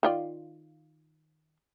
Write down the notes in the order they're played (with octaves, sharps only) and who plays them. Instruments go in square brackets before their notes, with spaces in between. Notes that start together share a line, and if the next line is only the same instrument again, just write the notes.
[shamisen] D#3 F4 D5